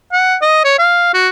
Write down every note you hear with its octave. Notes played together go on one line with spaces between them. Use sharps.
F#5
D#5
C#5
F5
F#4